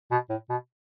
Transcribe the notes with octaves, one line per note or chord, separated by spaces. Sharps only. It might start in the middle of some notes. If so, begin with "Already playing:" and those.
B2
A2
B2